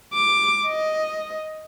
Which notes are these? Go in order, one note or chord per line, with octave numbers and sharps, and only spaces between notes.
D6
D#5